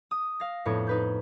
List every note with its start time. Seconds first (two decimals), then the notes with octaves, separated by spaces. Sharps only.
0.11 D#6
0.40 F5 A#6
0.65 F2 A2 B3 D4 C#5
0.87 D#4 B4 G6